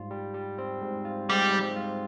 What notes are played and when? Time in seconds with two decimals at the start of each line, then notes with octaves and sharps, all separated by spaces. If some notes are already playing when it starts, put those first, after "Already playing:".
Already playing: G#2 G3 F4
0.10 G3
0.34 G3
0.58 C4
0.82 G#2
1.05 F4
1.29 G#2 G3
1.53 C4
1.76 F4